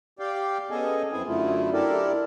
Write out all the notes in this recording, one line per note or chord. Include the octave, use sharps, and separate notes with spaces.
G4 D5 F5 G5
B3 C#4 G#4 A4 D#5 G#5
F#2 C4 E4 G#4 G#5
F#2 D3 A3 E4 F4
D4 E4 G4 A4 A#4 D5